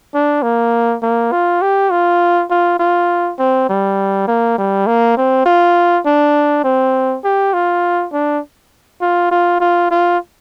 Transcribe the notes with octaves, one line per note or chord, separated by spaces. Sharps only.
D4
A#3
A#3
F4
G4
F4
F4
F4
C4
G3
A#3
G3
A#3
C4
F4
D4
C4
G4
F4
D4
F4
F4
F4
F4